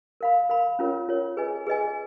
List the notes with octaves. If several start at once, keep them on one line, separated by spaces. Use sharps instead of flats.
A#4 F5 B5
A#4 F5 B5
C#4 F4 A#4 C#5
C#4 F4 A#4 C#5
G#4 B4 D#5 G#5
G#4 B4 D#5 G#5